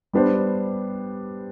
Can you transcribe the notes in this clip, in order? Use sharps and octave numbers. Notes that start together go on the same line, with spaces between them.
G3 B3 D4 G4 C5